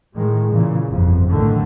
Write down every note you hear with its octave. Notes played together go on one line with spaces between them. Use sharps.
A2 D#3 G#3
A#2 C#3 E3
G1 F2
B1 A2 D3 D#3 A3